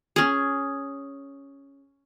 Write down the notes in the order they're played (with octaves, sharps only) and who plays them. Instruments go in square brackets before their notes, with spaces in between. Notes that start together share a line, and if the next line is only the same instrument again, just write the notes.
[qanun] C#4 G#4